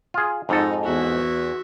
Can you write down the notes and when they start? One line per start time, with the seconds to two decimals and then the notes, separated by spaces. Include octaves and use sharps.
0.14 F4 G#4
0.49 F2 G#2 D#4 A4
0.84 E2 F#4 E5